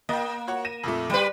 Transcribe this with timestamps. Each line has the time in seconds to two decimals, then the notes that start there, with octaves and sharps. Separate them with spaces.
0.09 A#3 D#5 G5
0.48 F#4 C#5 F#5
0.65 A#6 D#7 E7
0.83 F2 A#2 A3
1.10 G3 G4 B4 C5